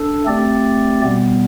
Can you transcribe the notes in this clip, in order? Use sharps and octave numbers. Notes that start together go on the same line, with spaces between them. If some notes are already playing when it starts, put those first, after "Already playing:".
Already playing: D4 A4
A3 C4 G4 D5
B2 G3 B3